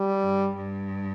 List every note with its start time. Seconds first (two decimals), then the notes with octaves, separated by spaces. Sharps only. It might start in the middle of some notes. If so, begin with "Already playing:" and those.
Already playing: G3
0.22 G2
0.56 G2